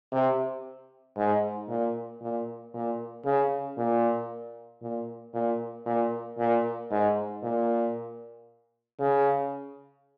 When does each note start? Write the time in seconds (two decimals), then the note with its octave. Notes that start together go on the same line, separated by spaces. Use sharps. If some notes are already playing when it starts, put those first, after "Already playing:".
0.12 C3
1.17 G#2
1.69 A#2
2.21 A#2
2.74 A#2
3.25 C#3
3.77 A#2
4.82 A#2
5.34 A#2
5.86 A#2
6.39 A#2
6.91 G#2
7.43 A#2
8.99 C#3